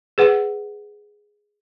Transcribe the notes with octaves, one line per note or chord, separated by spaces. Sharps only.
G#4 B4 F#5